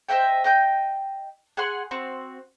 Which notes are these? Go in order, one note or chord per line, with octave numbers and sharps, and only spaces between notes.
C5 D#5 E5 G5
D#5 G5 G6
G#4 F#5 C6
C4 F#4